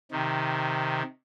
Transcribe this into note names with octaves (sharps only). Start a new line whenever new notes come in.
C3 D#3